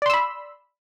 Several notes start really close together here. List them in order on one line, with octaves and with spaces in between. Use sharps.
D5 C6 E6 B5